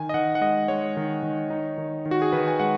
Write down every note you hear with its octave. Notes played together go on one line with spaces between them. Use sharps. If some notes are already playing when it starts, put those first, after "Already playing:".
Already playing: D#3 G#5
D#5
D#3 F#5
F#5
G#3 D#5
G#3 C#5
D#3
D#3
D#4
D#3
D#3
F#4
G#4
D#3 B4
G#5
G#3 F#5